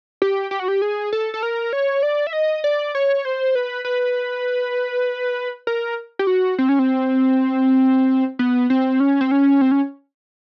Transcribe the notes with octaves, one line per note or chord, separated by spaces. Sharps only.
G4
G4
F#4
G4
G#4
A4
A4
A#4
C#5
D5
E5
D#5
D5
C#5
C5
B4
B4
A#4
G4
F#4
C4
C#4
C4
B3
C4
C#4
C4
C#4
C4
C#4